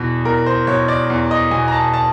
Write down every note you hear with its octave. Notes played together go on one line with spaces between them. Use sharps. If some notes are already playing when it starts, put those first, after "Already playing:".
Already playing: E2 B2
E2 A#4
C5
B2 C#5
D5
E2
D#5
B2 G#5
A#5
A5
A5